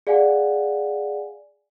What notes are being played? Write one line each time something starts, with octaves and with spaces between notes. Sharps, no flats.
G#4 D5 F5 F#5 G#5